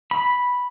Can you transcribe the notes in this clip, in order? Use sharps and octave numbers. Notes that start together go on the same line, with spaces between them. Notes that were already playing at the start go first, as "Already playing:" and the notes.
B5